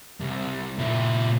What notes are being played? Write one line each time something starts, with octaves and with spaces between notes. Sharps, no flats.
C2
A#2 E4